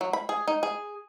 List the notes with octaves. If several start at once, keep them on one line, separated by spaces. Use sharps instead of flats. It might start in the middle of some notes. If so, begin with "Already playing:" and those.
F#3
B5
G#4
D#4
G#4